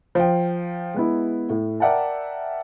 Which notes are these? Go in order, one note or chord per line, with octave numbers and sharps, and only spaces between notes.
F3 G5
G#3 B3 E4
A2
A#4 D5 E5 F#5 G5 A5